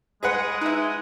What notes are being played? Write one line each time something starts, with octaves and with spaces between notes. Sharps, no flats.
G#3 G#4 B4 F#5 A#6
D#4 E4